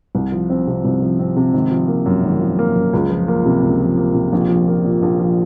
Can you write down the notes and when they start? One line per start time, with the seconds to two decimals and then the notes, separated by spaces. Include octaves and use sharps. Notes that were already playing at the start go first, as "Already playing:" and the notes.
0.15 C2
0.32 F3
0.50 C4
0.67 C3
0.85 C2
1.02 F3
1.19 C4
1.36 C3
1.54 G#1
1.71 F3
1.88 A#3
2.06 F#2
2.24 G#1
2.41 F3
2.59 A#3
2.76 F#2
2.93 C#2
3.10 F3
3.28 A#3
3.46 C3
3.63 C#2
3.80 F3
3.98 A#3
4.15 C3
4.33 A#1
4.49 F3
4.68 A#3
4.84 A#2
5.02 A#1
5.19 F3